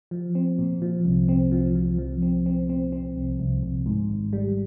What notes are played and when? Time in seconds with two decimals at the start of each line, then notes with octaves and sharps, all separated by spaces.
0.11 F3
0.35 C4
0.58 A#2
0.82 F3
1.05 C2
1.29 C4
1.52 F3
1.75 F3
1.98 F3
2.22 C4
2.46 C4
2.69 C4
2.92 C4
3.16 C2
3.40 C2
3.63 C2
3.86 G#2
4.10 G#1
4.33 G3